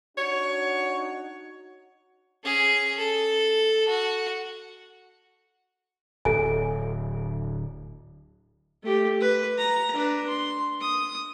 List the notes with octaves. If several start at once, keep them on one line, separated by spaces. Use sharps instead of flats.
D4 D#4 F#4 C#5
C#4 G#4
A4
F#4
D1 A4 G#5
A3 G4
B4
A#5
D4 B4
C6
D#6